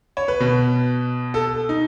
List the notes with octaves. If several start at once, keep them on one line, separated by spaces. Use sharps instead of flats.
C#5
B4
B2
A4
D#4